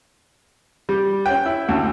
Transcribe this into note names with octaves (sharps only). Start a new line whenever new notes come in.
G3
C#4 G5
E4
D2